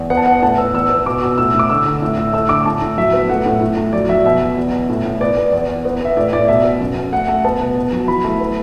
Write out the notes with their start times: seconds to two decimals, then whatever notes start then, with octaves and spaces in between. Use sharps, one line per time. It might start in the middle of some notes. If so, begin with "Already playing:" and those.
Already playing: E2
0.10 B3 F#5
0.17 A5
0.26 B3 F#5
0.42 A2 A5
0.58 B3 E6
0.74 E2 E6
0.89 B3
1.06 B2 D6
1.21 B2
1.38 A2 E6
1.54 A2
1.59 D6
1.70 D3 E6
1.86 D3
2.02 A2
2.18 A2
2.33 A3 E6
2.49 D3 D6
2.66 A2 A5
2.82 A2
2.98 F#3 E5
3.13 B3
3.29 A2 F#5
3.46 A2
3.61 A2
3.77 A2
3.93 F#3 D5
4.09 F#3 E5
4.26 B2 E5
4.41 B2
4.57 E2
4.72 B2
4.89 A2
5.04 A2
5.21 B3 D5
5.37 B3
5.52 E2
5.69 E2
5.85 B3
6.01 B3 E5
6.17 A2 D5
6.33 A2 D5
6.48 B2 E5
6.64 B3
6.80 F#2
6.96 F#2
7.12 A3 F#5
7.28 A3
7.45 B3 A5
7.60 B2
7.77 B2
7.93 F#3
8.08 E3 B5
8.24 A3
8.40 B3